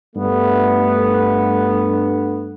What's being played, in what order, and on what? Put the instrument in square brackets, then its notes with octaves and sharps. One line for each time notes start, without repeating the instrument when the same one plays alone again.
[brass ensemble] G2 A3 B3